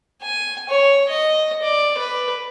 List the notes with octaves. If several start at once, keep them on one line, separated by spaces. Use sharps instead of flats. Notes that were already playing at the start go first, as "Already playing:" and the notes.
G#5
C#5
D#5
D5
B4